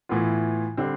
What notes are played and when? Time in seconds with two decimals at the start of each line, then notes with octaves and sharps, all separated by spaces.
0.09 A2 E3 B3 F4
0.77 D3 G3 C4